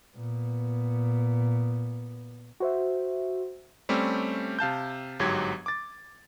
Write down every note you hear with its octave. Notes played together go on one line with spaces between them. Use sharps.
A#2 B3
F#4 C5 E5
G3 A3 C4 C#4 G4
C3 F5 A5 G6
G1 G#2 F#3 G4 G#6
D6 A6